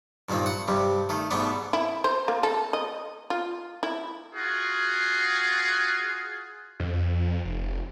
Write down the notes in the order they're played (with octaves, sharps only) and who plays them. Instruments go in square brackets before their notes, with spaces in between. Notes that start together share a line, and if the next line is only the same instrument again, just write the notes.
[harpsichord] G2 A#2 D#3 C4
F#5
G2 C3 G3
D#3 A3
G#2 B2 A3 B3 D4
[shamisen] E4
C5
A#3
A4
D#5
F4
E4
[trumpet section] F4 F#4 G#4
[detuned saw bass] F2
F1